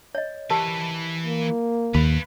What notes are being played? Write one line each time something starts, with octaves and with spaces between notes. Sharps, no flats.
C#5 D#5
E3 G4 A#4 B4 A5
A#3
D#2 B4 F5 B5